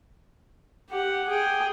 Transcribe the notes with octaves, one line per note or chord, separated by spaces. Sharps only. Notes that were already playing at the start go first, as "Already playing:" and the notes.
G4 F#5
G#4 G5